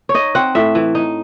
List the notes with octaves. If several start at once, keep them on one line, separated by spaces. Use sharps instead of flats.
C#5
D#4 D#5
C4 F#5
A2 E5
E3
D#4